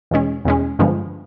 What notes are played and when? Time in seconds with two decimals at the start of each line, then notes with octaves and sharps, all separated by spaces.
0.11 E2 B2 G#3 C#4
0.45 E2 B2 G#3 C#4
0.79 G2 D3 F3 G#3 B3